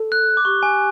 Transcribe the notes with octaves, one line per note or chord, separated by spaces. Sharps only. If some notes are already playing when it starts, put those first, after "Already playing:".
Already playing: A4
F#6
D6
G4 C#6
G#5